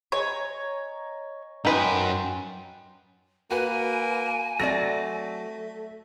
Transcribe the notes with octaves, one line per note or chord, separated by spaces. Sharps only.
C#5 D#5 G#5 A#5
F#2 D#4 B4 G5 G#5 C6
A#3 F#4 B4 G#5
F#3 A3 C4 D5 A#6